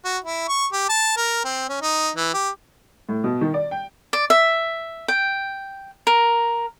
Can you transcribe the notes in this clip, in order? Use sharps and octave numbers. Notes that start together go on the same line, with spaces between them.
F#4
E4
C#6
G4
A5
A#4
C4
C#4
D#4
E3
G4
A2
B2
D#3
D5
G5
D5
E5
G5
A#4